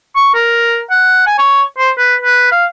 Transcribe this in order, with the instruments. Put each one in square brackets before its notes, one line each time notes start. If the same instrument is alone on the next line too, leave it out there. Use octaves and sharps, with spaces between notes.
[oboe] C#6
A#4
F#5
G#5
C#5
C5
B4
B4
F5